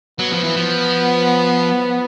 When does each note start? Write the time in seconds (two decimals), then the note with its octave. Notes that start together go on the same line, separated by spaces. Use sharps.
0.19 F#3 B3
0.32 F3
0.44 E3
0.57 F3